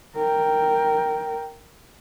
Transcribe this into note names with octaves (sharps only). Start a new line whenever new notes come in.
A#4 G5